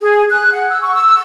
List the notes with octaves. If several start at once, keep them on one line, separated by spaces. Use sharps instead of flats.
G#4
F#6
F#5
E6
C#6
E6